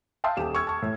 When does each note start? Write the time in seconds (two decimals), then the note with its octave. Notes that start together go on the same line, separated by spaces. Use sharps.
0.24 E5 F5 G5 A5 C6 D#6
0.37 D#1 G4 E7
0.54 C#6 E6 F6 G#6
0.67 A5 C#6
0.82 A2